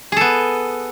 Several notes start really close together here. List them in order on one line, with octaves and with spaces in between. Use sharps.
G#4 A4 B3